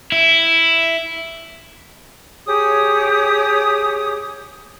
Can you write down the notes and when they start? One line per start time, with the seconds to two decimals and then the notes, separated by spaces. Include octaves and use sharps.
0.12 E4
2.47 G4 G#4 C#5 D#6